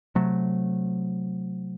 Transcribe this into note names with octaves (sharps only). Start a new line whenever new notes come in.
C3 F#3 A3